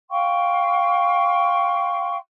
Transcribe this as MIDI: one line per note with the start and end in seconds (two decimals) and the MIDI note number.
0.10 2.17 77
0.10 2.17 79
0.10 2.17 84
0.10 2.17 85